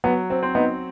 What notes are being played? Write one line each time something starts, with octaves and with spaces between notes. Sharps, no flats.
F#3 B3
C4
C4
B3 D#4